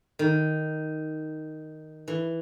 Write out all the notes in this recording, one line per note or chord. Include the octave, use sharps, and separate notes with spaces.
D#3
E3